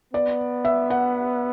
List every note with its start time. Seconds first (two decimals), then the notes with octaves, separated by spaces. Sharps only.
0.14 B3 D5
0.65 E5
0.90 F#5